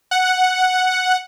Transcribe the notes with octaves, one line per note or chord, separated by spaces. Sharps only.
F#5